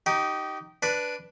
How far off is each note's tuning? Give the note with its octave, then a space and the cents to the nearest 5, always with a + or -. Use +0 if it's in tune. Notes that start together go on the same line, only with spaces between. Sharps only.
D#4 +0 G4 -25
D4 +0 B4 +0